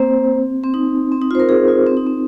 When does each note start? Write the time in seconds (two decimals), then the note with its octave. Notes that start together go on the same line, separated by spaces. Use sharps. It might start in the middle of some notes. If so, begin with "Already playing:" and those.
Already playing: A#3 C4 C5
0.64 C4
0.74 D#4
1.12 C4
1.22 D#4
1.31 F4 C5
1.40 A#4
1.49 G#4
1.68 F4
1.87 C4
1.97 D#4
2.07 C4